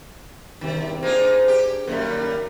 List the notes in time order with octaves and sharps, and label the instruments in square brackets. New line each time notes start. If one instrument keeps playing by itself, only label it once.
[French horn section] E2 G2 C3 [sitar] D#3
[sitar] A#3 D#4 F4 [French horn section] D4 G#4 C5
[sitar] G4
[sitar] F#2 A2 G3 [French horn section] D#3 A#3 A#4